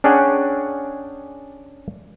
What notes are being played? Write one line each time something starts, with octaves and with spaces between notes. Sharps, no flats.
C#4 D4 G#4 C#5 F#5 G5